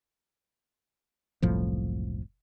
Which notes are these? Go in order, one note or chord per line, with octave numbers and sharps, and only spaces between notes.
F#1 C2 A2 F3